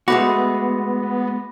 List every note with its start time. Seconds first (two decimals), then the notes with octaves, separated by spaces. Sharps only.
0.08 G#3 A3 B3 F#4 B5 D6 A#6